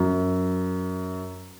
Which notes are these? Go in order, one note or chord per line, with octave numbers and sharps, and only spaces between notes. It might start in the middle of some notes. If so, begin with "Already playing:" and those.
Already playing: F#2